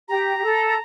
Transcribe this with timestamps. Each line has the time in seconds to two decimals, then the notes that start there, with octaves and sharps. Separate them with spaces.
0.08 G4 A#5
0.37 G4
0.43 A4